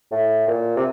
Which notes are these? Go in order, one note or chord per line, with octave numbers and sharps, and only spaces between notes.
A2
A#2
C3